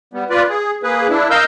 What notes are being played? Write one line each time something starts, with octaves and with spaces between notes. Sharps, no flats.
G3 B3
F4 B4 D5
G#4
A#3 G#4 B4
D4 E4
A#4 D#5 F5 E6 G6